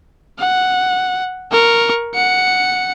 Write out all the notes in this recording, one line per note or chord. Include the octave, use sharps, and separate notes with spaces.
F#5
A#4 C#6
F#5 C#7